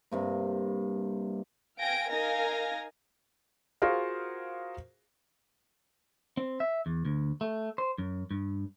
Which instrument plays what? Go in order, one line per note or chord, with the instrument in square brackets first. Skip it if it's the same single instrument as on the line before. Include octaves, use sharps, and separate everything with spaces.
[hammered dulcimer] G2 C3 A#3
[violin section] F5 G5 G#5 A#6 D7
D#4 A#4 F5 G#5 A#6
[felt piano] F4 F#4 G#4 A#4 C5 F5
[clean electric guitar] C4
E5
E2
D2
A3
C5
F#2
G2